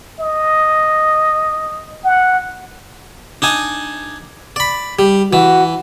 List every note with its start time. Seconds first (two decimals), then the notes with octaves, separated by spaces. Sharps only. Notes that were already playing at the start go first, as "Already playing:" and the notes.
0.20 D#5
2.04 F#5
3.42 D4 D#4 G#5
4.56 D5 B5
4.99 G3
5.33 E3 F#4